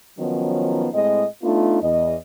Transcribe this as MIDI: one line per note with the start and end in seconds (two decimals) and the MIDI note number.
0.19 0.89 51
0.19 0.89 53
0.19 0.89 54
0.19 0.89 59
0.19 0.89 61
0.19 0.89 63
0.94 1.25 45
0.94 1.25 56
0.94 1.25 60
0.94 1.25 75
1.43 1.81 57
1.43 1.81 59
1.43 1.81 62
1.43 1.81 63
1.43 1.81 65
1.82 2.16 40
1.82 2.16 75